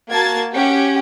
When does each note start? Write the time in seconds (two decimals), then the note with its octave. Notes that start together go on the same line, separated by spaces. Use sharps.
0.10 A#3 F#4 A5 G#6 A6
0.53 C#4 G4 F#5